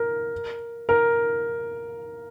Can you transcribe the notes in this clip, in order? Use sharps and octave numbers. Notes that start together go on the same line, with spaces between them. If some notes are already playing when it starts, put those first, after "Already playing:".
Already playing: A#4
A#4